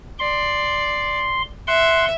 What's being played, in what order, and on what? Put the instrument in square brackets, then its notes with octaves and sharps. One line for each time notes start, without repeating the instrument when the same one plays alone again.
[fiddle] D5 [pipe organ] C6
[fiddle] E5 [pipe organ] F#5 C6